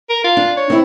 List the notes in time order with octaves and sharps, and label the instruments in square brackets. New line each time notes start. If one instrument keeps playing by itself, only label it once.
[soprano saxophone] A#4
F4
[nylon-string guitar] D4
[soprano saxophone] C#5
[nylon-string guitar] C4 E4